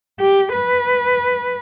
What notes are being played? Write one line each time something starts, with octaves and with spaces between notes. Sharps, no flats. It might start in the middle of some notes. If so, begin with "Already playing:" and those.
G4
B4